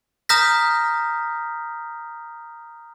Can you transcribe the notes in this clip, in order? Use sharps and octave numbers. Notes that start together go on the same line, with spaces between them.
A#5 D#6 F6 G6 A#6 B6